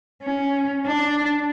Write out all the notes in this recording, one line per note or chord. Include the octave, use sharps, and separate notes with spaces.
C#4
D4